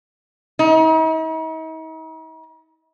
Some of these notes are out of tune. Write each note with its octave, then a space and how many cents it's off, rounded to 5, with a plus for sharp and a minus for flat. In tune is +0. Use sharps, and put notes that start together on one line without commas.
D#4 +45